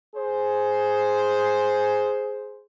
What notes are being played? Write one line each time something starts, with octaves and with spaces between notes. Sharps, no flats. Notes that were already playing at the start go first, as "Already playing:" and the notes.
G#4 C5